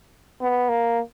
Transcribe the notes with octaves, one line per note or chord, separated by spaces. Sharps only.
B3
A#3